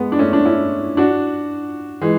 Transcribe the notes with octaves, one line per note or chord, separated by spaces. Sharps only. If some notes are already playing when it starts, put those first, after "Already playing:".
Already playing: G#3 B3
D4
A3 C#4
D4
C#4 E4
D4 F#4
E3 G#3